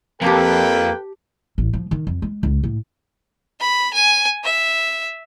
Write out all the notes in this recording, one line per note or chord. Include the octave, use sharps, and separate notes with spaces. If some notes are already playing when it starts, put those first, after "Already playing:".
F2 A#3 G4 A4 B4 G5 A5 A#5
A1
F3
D#3
F2
G#3
C#2
A2
B5
G#5
E5